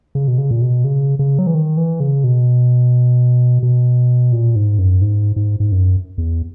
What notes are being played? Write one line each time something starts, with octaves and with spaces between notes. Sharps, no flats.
C#3
B2
C#3
A#2
B2
C#3
C#3
F#3
E3
D#3
E3
C#3
B2
B2
A#2
G#2
F#2
G#2
G#2
G#2
F#2
E2